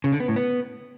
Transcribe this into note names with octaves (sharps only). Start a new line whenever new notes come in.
C#3
D3
B3
A2
B3